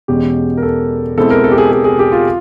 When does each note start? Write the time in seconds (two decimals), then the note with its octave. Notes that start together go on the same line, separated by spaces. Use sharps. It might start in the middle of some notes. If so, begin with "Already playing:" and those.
0.08 E2 B2 G#3 C#4 G4
0.57 A#4
0.63 A4
1.17 B2 G#3 C4 E4 A4
1.30 A#4
1.44 A4
1.52 G4
1.58 G#4
1.72 G#4
1.84 G#4
1.99 G4
2.12 F4